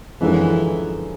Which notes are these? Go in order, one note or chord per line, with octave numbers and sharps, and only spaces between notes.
F#2 D3 E3 F3 G#3